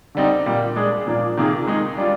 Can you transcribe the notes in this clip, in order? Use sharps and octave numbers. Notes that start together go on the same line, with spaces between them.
D3 G3 C4 D#4
A#2 G3 A#3
G#3 D4 G#4
A#2 F3 A#3 D4
C3 D#3 A#3 F4 G#4
D#3 G#3 D#4 G#4
G3 D4 F4